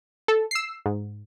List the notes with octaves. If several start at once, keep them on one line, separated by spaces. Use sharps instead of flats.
A4
E6 C7
G#2